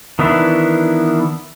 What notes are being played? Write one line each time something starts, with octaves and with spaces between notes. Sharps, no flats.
D#3 E3 B3 D4 E4